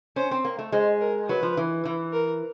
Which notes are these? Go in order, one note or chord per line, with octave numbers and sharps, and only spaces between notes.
C#4 C5
C4
A#3
A3
G#3 C5
A#4
F#3 B4
F3
E3
E3
A#4